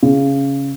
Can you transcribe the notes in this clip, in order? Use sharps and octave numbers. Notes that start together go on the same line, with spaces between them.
C#3